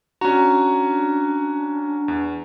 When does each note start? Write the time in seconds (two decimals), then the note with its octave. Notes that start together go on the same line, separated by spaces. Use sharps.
0.21 C#4 D4 F#4 A#5
2.08 E2